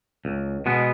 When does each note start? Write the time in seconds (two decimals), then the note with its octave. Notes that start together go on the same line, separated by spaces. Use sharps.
0.25 C#2
0.66 B2 G#3 B3